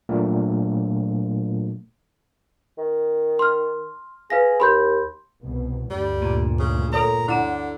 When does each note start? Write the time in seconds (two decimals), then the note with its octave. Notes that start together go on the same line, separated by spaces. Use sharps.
0.09 A#2 F#3 A3 A#3 D4 F4
2.78 D#3
3.39 C6 F6
4.30 G#4 B4 F5 A#6
4.60 D#2 B5 C6 G6
5.43 C2 B2
5.91 D2 G2 G3
6.22 A#2
6.60 C#3
6.93 A4 A#4 C#5 C6
7.28 D3 E4 F#5 A#5